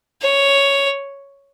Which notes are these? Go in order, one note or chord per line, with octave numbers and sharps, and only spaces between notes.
C#5